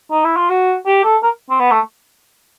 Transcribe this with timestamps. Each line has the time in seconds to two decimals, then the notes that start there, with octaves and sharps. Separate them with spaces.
0.11 D#4
0.24 E4
0.37 F4
0.49 F#4
0.86 G4
1.04 A4
1.23 A#4
1.50 C4
1.59 B3
1.71 A3